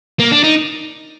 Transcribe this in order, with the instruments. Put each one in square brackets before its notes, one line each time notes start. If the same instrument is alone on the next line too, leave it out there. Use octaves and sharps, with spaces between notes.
[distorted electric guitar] A#3
D4
D#4